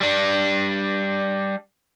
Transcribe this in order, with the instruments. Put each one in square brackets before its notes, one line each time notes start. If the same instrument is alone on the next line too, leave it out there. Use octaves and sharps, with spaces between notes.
[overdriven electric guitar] G3 D4